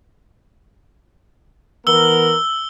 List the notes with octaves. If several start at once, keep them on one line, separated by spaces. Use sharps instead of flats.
E3 B3 A#4 E6 G7